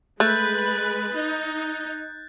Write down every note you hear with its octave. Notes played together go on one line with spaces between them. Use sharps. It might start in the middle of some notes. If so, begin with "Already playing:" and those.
G#3 A3 B4 F#6 G6 A6
D#4